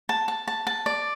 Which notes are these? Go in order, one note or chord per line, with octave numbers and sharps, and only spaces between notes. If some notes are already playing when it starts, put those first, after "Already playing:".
A5
A5
A5
A5
D5